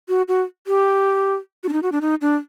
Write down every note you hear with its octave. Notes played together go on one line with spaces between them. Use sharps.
F#4
F#4
G4
F#4
D4
D#4
F#4
D4
D#4
D4